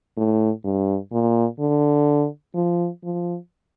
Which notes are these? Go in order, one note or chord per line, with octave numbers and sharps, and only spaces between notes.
A2
G2
A#2
D3
F3
F3